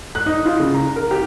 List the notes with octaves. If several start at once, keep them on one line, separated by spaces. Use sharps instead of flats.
F#6
D#4
F4
C#3
A#5
A#4
G4